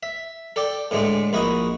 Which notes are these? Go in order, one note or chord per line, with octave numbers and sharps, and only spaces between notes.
E5
A4 D5 G5 A5
A2 D3 G#3 A3
A#1 E4 F#4 D#5